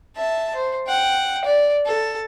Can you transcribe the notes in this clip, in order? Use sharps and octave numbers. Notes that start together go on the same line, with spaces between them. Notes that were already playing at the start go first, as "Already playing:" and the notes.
E5 A5
C5
F#5 G5
D5
A4